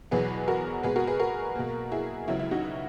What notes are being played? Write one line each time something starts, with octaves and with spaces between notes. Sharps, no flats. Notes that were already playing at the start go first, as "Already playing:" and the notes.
E2 B2 F#3 B3 G#4 B4
F#4 A#4
B2 G#3 B3 G#4 B4
F#4 A#4
G#4 B4
F#4 A#4
B2 A#3
E4 G#4
C#2 C#3 F#3 B3 E4
E4
D#4 F#4